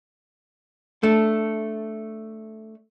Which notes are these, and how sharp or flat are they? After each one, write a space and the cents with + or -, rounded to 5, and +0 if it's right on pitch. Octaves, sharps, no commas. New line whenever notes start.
A3 +0 D4 +0